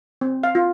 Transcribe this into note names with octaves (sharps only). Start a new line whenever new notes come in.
C4
F5
F4